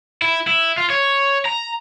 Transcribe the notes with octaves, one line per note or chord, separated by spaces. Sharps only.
E4
E4
F4
C#5
A#5